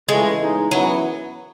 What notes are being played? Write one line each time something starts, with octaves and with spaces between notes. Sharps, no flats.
C#2 C#3 E3 G#3 A3
E2 C#3 G#3 D#4
F#2 E3 F#3 B3 E4